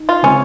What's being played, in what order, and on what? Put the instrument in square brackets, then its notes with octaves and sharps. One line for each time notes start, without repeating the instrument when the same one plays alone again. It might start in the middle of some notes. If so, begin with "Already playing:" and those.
Already playing: [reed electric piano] D#4
[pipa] F4
[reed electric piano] C#3 G#3 C4 [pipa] C#4